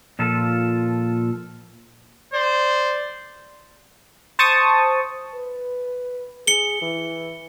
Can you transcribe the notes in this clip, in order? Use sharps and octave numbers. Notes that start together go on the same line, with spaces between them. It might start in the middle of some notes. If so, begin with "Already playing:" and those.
A#2 F3 F4 A4
C5 D5
C5 A5 C#6 D#6
B4
G#4 C#7 G7
E3